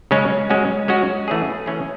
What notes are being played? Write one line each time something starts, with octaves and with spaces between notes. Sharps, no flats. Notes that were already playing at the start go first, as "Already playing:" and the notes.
C#3 G#3 C#4
G#3 C#4 F#4
G#3 C#4 F#4
E3 A3 C#4 G#4
E3 A3 C#4 G#4